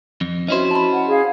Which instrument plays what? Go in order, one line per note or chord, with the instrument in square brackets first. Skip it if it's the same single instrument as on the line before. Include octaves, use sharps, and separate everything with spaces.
[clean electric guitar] F2
[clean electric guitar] C#4 E4 C5 [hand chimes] F#4 D#5
[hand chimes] A5 B5
[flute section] F#5
G#4 F5